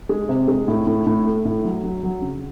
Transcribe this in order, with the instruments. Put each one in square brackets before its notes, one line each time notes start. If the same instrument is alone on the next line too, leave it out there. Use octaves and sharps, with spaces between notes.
[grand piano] G#3
C3
G#3
A2
A2
A2
A3
A2
F#3
F#3
F#3
C#3